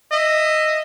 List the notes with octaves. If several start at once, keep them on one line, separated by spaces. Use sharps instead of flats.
D#5 E5